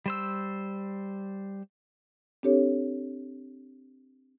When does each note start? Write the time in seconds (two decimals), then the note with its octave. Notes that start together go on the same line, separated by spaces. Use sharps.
0.06 G3 C5 E6
2.43 C4 D4 G4 A4 C#5